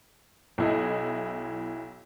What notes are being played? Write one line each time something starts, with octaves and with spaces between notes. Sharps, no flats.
B1 E4 D#5